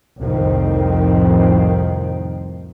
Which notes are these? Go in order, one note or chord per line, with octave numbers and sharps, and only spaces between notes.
C2 F2 A2 D#3 F3 C4